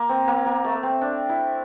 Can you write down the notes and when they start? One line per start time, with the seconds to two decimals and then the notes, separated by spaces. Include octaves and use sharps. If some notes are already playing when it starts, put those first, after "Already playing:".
Already playing: A#3
0.09 C4
0.28 A#3
0.46 A#3
0.64 A3
0.83 C4
1.01 D4
1.29 E4